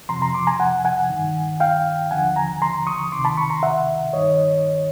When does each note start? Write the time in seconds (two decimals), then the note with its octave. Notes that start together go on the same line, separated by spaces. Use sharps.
0.09 F2 C3 F3 A#5 C6
0.22 A#5 C6
0.34 C6 D6
0.47 G#5 A#5
0.60 F#5 G#5
0.85 F#5 G#5
1.10 G2 D#3
1.60 F5 G5
2.11 D#2 D3 F3 F#5 G#5
2.36 G#5 A#5
2.62 A#5 C6
2.87 C#6 D#6
3.12 C#2 C3 D#3 C6 D6
3.25 A5 B5
3.37 B5 C#6
3.50 A#5 C6
3.63 E5 F#5
4.13 G2 D#3 C#5 D#5